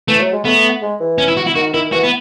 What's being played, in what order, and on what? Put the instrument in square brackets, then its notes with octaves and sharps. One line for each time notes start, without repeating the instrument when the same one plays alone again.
[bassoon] E3 [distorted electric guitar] A3
[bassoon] F#3
G#3
[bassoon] A3 [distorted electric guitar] B3
[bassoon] G#3
E3
[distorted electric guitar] C#4
E4
F#4
E4
[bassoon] D#3 [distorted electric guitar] F#4
[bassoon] D#3 [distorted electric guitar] E4
[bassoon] E3 [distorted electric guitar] F#4
[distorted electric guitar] B3